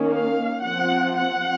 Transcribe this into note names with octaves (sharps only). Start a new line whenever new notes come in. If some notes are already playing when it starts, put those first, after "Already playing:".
Already playing: D#3 A#3 C#4
F5
F3 C4 F#5
F#5